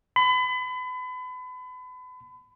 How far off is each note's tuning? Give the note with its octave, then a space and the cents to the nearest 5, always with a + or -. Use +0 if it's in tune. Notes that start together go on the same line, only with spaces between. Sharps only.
B5 +35